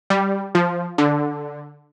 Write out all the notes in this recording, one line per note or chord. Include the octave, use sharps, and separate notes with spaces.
G3
F3
D3